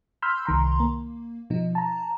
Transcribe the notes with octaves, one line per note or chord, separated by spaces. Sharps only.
B5 C6 E6 F6 G6
C2 D#3 A#5 C6
A#3
B2 F3 D#4
A5 A#5